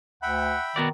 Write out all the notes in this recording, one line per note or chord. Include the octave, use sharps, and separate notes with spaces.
D2 E5 F#5 G5 B5
D#3 B3 F#4 D5